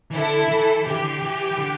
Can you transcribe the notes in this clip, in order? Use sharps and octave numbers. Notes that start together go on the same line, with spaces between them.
E3
D3 E4 A4
D3
E3
D3 G4
E3
D3
E3
E3
D3